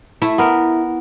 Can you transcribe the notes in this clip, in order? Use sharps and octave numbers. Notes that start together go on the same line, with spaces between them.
A3 E4
B3 A#4